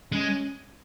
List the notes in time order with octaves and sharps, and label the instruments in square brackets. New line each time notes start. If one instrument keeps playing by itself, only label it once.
[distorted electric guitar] G#3 [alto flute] C#4